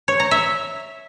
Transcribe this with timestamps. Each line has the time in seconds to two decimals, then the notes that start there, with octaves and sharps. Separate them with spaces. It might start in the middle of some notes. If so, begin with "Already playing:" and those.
0.08 C#5
0.20 A#5
0.31 E5